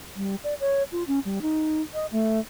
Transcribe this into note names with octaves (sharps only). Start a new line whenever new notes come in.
G3
D5
C#5
F4
C#4
G3
D#4
D#5
A3